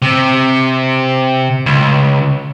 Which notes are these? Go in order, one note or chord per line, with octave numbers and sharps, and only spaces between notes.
C3
C#2